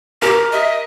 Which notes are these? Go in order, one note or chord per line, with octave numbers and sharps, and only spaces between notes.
G4 A#4
D#5 E5